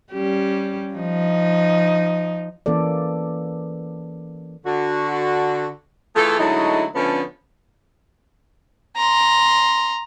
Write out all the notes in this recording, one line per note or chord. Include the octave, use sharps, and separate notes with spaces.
G3 C#4 G4
F3 D#4
E3 A#3 C#4 A4 D5
D3 F#4
E3 A3 F4 G#4 A4
D3 F#3 G#3 A3 D#4 E4
D3 F3 A3 B3 C#4
A#5 C6